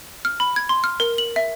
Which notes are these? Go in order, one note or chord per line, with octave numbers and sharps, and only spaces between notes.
F6
B5
G#6
C6
F6
A#4
F#7
E5